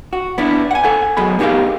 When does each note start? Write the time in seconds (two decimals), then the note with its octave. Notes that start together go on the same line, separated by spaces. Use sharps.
0.13 F#4
0.38 B3 D4 E4
0.71 F#5 G#5
0.84 A4 F#5 G#5
1.17 F#2 B2 G#4 B5
1.39 B3 D#4 G4 G#4 A#4 F5